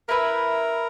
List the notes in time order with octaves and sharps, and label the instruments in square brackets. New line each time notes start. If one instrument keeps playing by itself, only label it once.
[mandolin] E4 B4 E5 [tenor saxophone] A#4